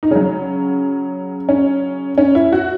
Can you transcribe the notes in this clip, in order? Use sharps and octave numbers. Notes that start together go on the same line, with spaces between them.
D#4
C#3 F#3 C#4
C#4
C#4
E4
F#4